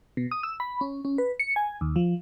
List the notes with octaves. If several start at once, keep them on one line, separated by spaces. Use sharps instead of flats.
B2
D#6
E6
B5
C#4
C#4
B4
C#7
G#5
D#2
F3